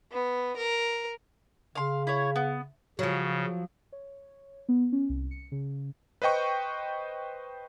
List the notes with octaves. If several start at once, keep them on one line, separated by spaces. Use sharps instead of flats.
B3
A#4
C#3 F5 C6
E4 C#5
B3
C#3 F3 F#3
C#5
B3
C#4
C2
C#7
C#3
B4 C5 D#5 G5 C#6